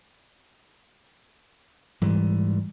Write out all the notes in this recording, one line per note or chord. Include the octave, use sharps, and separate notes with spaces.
G#2 E3 G3